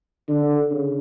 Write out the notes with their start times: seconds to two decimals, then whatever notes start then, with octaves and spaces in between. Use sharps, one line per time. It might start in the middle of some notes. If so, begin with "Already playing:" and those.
0.28 D3
0.71 C#3